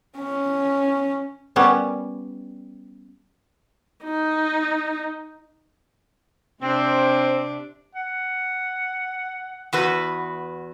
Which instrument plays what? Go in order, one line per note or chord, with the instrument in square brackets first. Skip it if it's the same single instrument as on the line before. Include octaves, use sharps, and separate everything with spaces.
[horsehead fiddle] C#4
[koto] G3 B3 C#4
[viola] D#4
[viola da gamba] C3 D4 [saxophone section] C4
[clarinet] F#5
[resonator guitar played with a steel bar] E2 F#4 B4